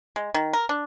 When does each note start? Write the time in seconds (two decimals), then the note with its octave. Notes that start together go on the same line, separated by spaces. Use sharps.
0.16 G#3
0.34 D#3
0.53 A#4
0.69 D4